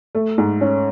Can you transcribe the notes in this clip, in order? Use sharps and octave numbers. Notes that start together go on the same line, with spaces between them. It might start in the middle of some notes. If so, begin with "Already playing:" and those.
A3
G#2
C#4